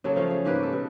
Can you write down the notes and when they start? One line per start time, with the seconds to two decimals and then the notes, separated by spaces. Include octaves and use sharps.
0.04 C#3 F#3 A#3 A4
0.16 F3 A3 C#4 F5
0.30 G#4
0.45 G#2 A#3 G4 B4
0.58 F#4 A4
0.73 B2